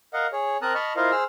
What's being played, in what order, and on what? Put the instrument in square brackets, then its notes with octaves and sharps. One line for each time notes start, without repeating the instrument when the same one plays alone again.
[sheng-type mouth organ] A#4 D#5 F5 F#5
G#4 C#5
C4 A#4 A5 A#5 D#6 F#6
D#5 A5 B5 C#6 F6
E4 F4 A#4 C5 D#5 F5
G#4 C5 E6 F6